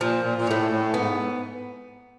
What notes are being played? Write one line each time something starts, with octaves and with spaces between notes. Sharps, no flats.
A#2 F3
A#2
A#2
A2 A3 C#4
A2
G#2 B3